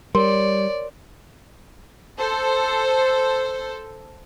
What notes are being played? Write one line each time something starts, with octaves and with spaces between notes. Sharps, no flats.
G3 A#4 C#5 D5 C6
A4 C5